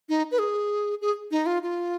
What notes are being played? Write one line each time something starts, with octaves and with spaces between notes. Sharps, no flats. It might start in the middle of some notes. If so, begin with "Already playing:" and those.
D#4
B4
G#4
G#4
D#4
F4
F4